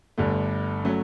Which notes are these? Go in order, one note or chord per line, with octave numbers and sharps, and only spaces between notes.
G1 G2 D3 A3
F#3 A3 C#4